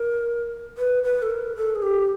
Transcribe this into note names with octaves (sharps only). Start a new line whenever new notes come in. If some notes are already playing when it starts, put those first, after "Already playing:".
Already playing: A#4
B4
B4
A4
A#4
A4
G#4
G4